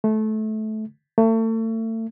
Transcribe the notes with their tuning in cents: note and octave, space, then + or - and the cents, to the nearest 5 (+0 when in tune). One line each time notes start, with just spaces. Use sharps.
A3 -20
A3 +35